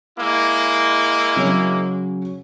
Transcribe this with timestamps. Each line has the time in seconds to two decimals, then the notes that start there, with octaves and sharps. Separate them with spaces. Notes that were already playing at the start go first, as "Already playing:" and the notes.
0.19 G#3 A#3 E4
1.36 C#3 F#3 C#4